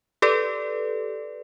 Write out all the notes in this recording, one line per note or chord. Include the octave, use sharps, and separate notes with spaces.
G4 A4 B4 D5